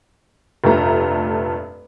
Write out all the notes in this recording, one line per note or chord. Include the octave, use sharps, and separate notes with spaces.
F1 G2 A#2 A3 A#5